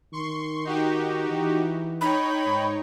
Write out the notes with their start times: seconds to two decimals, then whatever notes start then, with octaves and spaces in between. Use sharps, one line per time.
0.13 D#3 C6 C#6
0.65 D#4 F#4 G4
1.30 E3
2.01 D#4 C#5 G5 B5
2.46 G#2